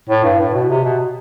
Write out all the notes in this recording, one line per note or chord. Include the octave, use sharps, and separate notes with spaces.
A2
G2
A2
B2
C3
B2